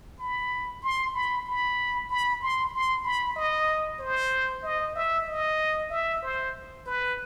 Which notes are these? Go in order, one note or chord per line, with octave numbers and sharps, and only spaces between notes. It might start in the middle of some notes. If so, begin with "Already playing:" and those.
B5
C6
B5
B5
B5
C6
C6
B5
D#5
C5
D#5
E5
D#5
E5
C5
B4